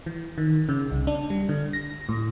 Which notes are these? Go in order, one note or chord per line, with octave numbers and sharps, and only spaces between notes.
E3
D#3
C#3
C2
D4
G3
D3
A#6
A2